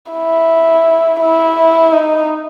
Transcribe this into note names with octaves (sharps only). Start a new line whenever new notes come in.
E4
E4
D#4